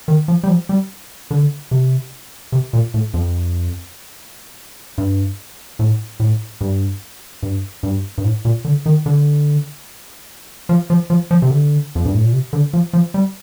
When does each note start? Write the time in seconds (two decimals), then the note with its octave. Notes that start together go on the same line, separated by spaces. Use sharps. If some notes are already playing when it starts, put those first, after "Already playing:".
0.08 D#3
0.28 F3
0.43 G3
0.49 F3
0.69 G3
1.31 D3
1.71 C3
2.52 C3
2.73 A#2
2.94 A2
3.14 F2
4.98 G2
5.79 A2
6.20 A2
6.61 G2
7.43 G2
7.83 G2
8.18 G2
8.24 A2
8.45 A#2
8.65 D3
8.86 D#3
9.06 D3
10.69 F3
10.90 F3
11.10 F3
11.31 F3
11.42 C3
11.51 D3
11.95 F2
12.05 G2
12.14 A2
12.23 A#2
12.33 C3
12.53 D3
12.73 F3
12.93 F3
13.14 G3